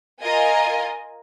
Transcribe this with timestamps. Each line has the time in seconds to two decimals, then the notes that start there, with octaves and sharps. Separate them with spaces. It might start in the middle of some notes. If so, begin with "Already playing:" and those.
0.21 F4 A#4 D#5 G#5